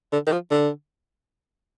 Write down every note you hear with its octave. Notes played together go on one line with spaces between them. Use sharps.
D3
D#3
F3
D3